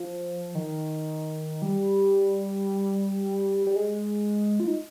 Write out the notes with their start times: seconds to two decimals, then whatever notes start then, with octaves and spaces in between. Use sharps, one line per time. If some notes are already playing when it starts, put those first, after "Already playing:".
Already playing: F3
0.55 D#3
1.62 G3
3.67 G3
3.76 G#3
4.60 F4
4.67 D#4